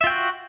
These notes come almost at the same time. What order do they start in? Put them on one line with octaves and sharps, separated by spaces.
E5 F4 G5 F#4